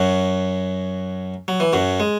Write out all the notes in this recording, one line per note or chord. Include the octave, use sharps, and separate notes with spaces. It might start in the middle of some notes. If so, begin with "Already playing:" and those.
Already playing: F#2 F#3
F#3
E3
F#2 F#3
G#3